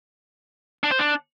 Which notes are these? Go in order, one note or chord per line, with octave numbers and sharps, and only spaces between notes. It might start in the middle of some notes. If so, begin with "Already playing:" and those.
D4
C5
D4